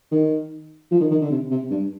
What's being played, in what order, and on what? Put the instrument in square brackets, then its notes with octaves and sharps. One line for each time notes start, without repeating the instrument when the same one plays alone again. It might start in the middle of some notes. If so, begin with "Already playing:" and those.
[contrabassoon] D#3
F3
D#3
D#3
D3
C3
C3
G2